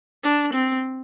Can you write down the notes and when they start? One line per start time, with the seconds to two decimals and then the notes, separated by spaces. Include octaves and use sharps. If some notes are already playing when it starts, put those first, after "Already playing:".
0.24 D4
0.53 C4